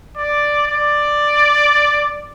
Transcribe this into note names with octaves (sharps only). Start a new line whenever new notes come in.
D5
D5